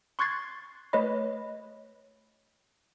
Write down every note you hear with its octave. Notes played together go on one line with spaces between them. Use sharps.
C6 C#6 F#6 G#6 A6 C7
A3 B4 C#5 D#5 B5